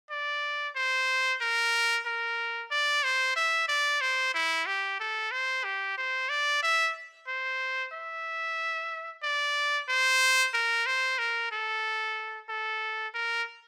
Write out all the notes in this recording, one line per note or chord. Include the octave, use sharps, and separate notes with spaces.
D5
C5
A#4
A#4
D5
C5
E5
D5
C5
E4
G4
A4
C5
G4
C5
D5
E5
C5
E5
D5
C5
A#4
C5
A#4
A4
A4
A#4